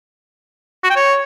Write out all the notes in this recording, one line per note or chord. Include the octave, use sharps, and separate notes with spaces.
F#4
G5
C#5